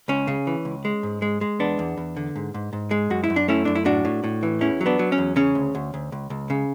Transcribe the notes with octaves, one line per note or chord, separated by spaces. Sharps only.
C#2 C#4
C#3
E3
C#2
G#3
G#2
G#3
G#3
E2 B3 D4
E2
E2
D3
G#2
G#2
G#2
G#3
F#2 F#4
E4
F#2
D4
A3 C#4 E4
F#2 D4
E4
A2 D4 F#4
A2
A2
E3
E2 C#4 E4
F#3
B3 D4
F#3
C#4
E2
C#3 C#4
D2
D2
D2
C#2
C#2
C#3